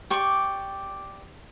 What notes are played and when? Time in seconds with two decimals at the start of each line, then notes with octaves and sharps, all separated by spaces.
0.10 G4 D5 C#6